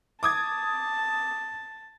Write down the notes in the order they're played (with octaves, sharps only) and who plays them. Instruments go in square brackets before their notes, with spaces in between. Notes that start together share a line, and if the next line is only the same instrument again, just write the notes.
[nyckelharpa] A5 [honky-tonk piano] D6 D#6 G#6